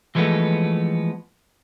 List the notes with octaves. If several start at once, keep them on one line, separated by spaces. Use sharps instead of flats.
E3 F3 G#3 A3 B3